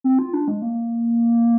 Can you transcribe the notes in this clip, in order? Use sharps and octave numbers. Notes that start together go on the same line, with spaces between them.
C4
F4
D4
G#3
A#3